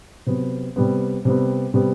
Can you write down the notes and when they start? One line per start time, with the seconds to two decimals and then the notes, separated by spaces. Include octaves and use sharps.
0.27 C3 F#3 B3
0.76 C3 G3 B3
1.25 C3 G3 B3
1.74 C3 G3 B3